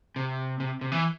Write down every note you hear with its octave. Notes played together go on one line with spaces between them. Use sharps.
C3
C3
C3
E3